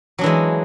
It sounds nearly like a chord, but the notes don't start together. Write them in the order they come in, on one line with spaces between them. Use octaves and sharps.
F#3 D4 E3 G#3